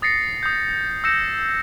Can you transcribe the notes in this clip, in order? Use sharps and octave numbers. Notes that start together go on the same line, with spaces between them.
D#6 A6 A#6 C7 C#7
D#6 G6
E6 G6 A#6 C#7 E7